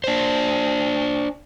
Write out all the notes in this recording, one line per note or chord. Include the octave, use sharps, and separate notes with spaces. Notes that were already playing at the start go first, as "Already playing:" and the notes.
D4 C5